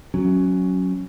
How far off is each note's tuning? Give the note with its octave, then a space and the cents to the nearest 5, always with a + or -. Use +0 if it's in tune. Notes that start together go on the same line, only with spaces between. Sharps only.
F#3 +0 C#4 +0